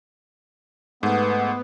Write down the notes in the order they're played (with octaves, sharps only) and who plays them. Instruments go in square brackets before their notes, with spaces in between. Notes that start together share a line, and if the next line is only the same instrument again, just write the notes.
[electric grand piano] G#2 A3 [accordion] B3